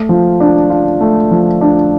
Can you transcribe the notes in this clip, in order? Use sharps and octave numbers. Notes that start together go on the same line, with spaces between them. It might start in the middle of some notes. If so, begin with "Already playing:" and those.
Already playing: A3
F3
D4
F4
A3
F3
D4